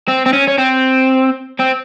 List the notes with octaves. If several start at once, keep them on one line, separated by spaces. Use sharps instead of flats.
C4
C4
C#4
C#4
C4
C4